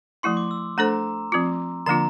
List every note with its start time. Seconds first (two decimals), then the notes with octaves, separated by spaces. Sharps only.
0.23 F3 A3 E4 C6
0.37 D6
0.51 E6
0.78 A3 D4 A4 C5 A#5
1.32 F3 C4 F4
1.86 D3 F3 A#3 D4 F4 A#5